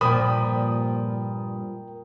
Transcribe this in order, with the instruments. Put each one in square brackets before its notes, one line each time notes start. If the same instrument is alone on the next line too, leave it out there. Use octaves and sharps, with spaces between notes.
[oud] G2 A#2 F3 [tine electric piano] A#4 G5 [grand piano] B5 D#6